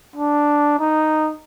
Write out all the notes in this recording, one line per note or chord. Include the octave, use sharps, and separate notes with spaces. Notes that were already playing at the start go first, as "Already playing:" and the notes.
D4
D#4